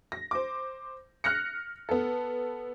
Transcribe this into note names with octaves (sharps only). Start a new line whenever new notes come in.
A#6
C5 D6
F6 F#6 A#6 C#7
B3 A4